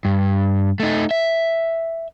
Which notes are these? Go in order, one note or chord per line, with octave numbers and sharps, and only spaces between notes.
G2
A3 D#4
E5